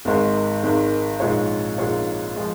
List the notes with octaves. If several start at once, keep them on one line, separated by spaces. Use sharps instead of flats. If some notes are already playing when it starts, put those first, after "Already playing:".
G#1 G#2 D#3 G#3
G#1 G#2 D#3 G#3
A#1 G#2 G#3 F4 C#5
A#1 G#2 G#3 F4 C#5
F3 G#3